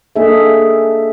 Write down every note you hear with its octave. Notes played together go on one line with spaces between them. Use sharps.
A#3 D4 G#4 A4 D#5 E5